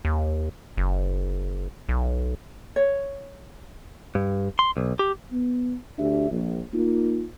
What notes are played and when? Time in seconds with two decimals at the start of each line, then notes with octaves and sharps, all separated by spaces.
0.05 D#2
0.77 F#1
1.89 B1
2.76 C#5
4.15 G2
4.59 C6
4.77 B1
4.99 G4
5.31 B3
5.98 D2 D4 G4 E5
6.31 A#1
6.73 A#3 D#4 F4